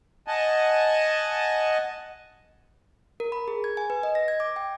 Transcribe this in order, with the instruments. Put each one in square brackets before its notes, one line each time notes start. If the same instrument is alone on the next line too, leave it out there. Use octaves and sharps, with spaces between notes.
[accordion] D#5 F#5 G#5 A5
[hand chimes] A#4
B5
G#4
G#6
G#5
B4
D#5
A#6
G#6
D6
G5